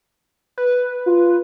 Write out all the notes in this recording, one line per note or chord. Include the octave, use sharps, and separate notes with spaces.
B4
F4